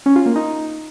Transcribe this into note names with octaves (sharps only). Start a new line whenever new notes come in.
C#4
F4
A#3
D#4